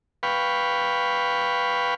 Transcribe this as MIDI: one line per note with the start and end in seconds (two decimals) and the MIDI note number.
0.23 1.94 71
0.23 1.94 77
0.23 1.94 79
0.23 1.94 83
0.23 1.94 85